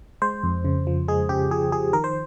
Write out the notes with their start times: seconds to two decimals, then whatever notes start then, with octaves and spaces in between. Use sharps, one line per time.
0.22 G#3 C5
0.43 F2
0.65 C#3
0.87 F3
1.08 G#3 G#4
1.29 C#3 G4
1.51 F3 G#4
1.72 F3 G#4
1.93 D#3 A#4
2.04 C5